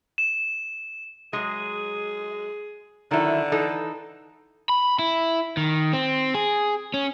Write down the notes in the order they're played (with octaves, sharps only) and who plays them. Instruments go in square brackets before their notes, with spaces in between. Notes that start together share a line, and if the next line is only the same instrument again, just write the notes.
[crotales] E7
[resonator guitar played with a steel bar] F#3 G#3 [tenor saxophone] G#4
[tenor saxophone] D3 [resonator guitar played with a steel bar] D#3 F#3 E4
[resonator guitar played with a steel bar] E3 D#4 A4
[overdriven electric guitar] B5
E4
D#3
C4
G#4
C#4